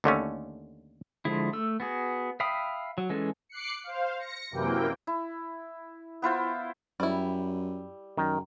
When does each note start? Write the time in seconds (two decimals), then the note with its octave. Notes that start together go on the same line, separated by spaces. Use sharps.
0.04 D#2 D3 A3 C#4
1.25 D3 F3 G#3 E4
1.53 A3 E6
1.80 B3 F#4 G#4
2.40 E5 F5 G5 B5 D#6
2.98 F#3
3.10 E3 G#3 C#4 A4
3.49 D6 F#6 C7 C#7
3.84 C5 F5
4.19 A#6 C#7
4.51 F#2 C3 E3 A#3 G5
5.07 E4
6.22 B3 E4 F4 C5
7.00 F#2 G3 E4
8.17 F#2 D#3